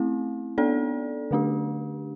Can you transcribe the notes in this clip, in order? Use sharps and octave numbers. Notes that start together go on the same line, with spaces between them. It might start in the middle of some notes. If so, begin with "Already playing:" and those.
Already playing: A3 C4 E4
B3 D4 A4 D5
D3 A3 D4 G4